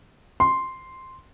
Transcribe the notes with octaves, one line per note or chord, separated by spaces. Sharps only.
C6